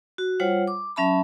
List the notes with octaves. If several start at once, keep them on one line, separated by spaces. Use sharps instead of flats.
F#4
G3 F4 C5 C#5 F#5
D6
F#3 C#4 E5 A5 B5